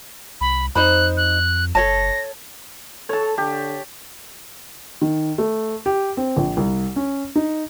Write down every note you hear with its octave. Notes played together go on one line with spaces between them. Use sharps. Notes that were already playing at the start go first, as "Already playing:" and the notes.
C2 B5
F2 D#4 C5 B5 F#6
F#6
F#1 A4 C#5 A5 A#6
A4 C#5 A5
D3 G4
D#3
A3
G4
C4
A#1
C2
C#4
D#4